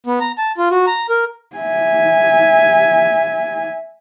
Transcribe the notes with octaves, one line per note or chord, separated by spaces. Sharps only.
B3
A#5
A5
F4
F#4
A#5
A#4
E5 G#5